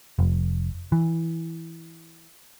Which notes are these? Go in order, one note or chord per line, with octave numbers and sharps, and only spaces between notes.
F1
E3